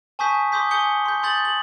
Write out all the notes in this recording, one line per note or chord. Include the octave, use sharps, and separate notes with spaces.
G#5 A5 C#6 D#6 G6 B6
C6 D6 D#6 G6 B6
G#5 D#6 G6 C#7 G7
C6 G6
C6 D#6 G6 A6 F#7
F#7